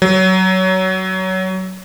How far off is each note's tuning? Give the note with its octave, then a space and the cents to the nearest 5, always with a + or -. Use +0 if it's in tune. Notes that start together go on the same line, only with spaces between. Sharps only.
F#3 +20